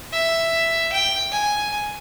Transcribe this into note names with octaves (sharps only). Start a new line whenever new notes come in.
E5
G5
G#5